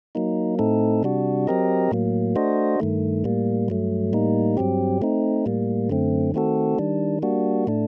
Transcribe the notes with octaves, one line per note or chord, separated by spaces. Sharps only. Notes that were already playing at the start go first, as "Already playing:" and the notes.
F#3 A#3 D#4
A2 A3 C4 D#4 A4
C3 G3 D4 F#4
F#3 C4 G4 A#4 D#5
A2 F#3 A#3
A3 D4 F#4 C5 D#5
G2 D#3 A3
A2 G3 A#3
G2 F#3 A3
A2 G3 A#3 D#4
G2 F#3 C4 G4
A3 C4 D#4
A2 G3 A#3
F#2 D3 A3 C4
D#3 A3 C4 F#4 A4
D#3 G3 D4
G3 A#3 D4 F#4
A2 A3 D4